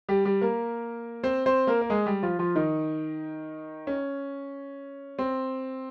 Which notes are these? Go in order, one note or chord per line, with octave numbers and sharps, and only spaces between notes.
G3 G4
G3 G4
A#3 A#4
C4 C5
C4 C5
A#3 A#4
A#4
G#3 G#4
G3 G4
F3 F4
F3 F4
D#3 D#4
C#4
C4